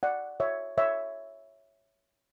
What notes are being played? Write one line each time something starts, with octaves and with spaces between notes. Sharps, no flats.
D5 F#5
C#5 E5
C#5 E5